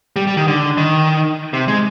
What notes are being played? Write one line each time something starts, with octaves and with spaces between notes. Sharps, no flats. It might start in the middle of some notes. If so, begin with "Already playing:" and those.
G3
G3
D#3
D3
D#3
C3
G#3